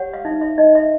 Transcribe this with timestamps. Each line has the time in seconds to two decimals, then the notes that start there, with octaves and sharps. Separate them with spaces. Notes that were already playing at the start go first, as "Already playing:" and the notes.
Already playing: G4 C#5 F#5
0.14 F5
0.25 D#4 E5
0.41 E5
0.58 D#4 D#5
0.75 E5